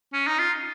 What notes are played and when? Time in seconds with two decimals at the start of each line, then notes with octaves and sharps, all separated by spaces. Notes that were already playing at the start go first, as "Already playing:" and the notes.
0.13 C#4
0.27 D#4
0.39 F4